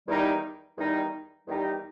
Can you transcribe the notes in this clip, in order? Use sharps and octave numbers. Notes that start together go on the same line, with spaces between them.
E2 D#3 G3 D#4 G4
E2 D#3 G3 D#4 G4
E2 D#3 G3 D#4 G4